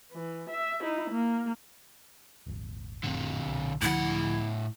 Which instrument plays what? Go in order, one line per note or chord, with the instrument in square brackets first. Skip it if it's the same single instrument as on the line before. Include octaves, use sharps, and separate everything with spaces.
[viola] E3
E5
D#4 E4
A#3
[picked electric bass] D#1 G#1
[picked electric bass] F1 A2 [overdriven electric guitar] D3 C4
[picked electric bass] B1
[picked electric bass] C#2 D3 F3 [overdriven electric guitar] A2 F#5 [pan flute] E4